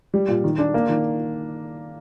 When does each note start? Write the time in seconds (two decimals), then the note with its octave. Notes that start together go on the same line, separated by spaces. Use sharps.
0.14 G3
0.28 A#2
0.44 D#3
0.58 D4
0.74 A#3
0.89 D#3